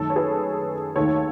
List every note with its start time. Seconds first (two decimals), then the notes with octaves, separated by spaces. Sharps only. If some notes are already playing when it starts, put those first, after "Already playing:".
Already playing: F#2 D#3 A3 C#4 A4
0.10 C#5
0.15 G#4 B4
0.96 D#2 D#3 A3 A4 C#5